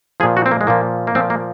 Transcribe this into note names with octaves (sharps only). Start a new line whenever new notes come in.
A#2 F3 G#4
F#4
C4
A#3
G#3
A#2 F3 A#3
A#3
A#2 F3 C4
A#3